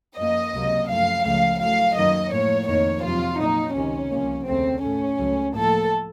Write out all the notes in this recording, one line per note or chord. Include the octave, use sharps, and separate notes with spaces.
F#2 F3 A#3 D#5
C#2 C3 F#3 A#3
F#2 F3 A3 F5
C#2 C#3 F3 A3 F5
A2 F#3 A3 F5
F#2 D#3 F#3 A#3 D#5
A2 F3 A#3 C#5
F2 D#3 A#3 C#5
F2 C3 F#3 F4
A#2 F#3 A#3 D#4
C#2 C3 D#3 C#4
C2 C3 F3 A#3
D#2 C#3 A3 C4
A2 A3 C#4
C#2 C#3 F#3 A3
A2 F3 A#3 A4